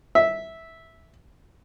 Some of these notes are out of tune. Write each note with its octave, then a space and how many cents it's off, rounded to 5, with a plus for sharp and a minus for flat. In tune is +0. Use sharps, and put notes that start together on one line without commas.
E5 -10